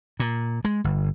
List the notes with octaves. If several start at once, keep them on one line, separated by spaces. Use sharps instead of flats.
A#2
G#3
G1